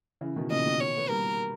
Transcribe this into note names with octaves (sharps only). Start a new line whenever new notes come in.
C#3 E3
B2 D#3
A#2 C#3 D#5
B2 D#3
C#5
B3
G3 A#3 A#4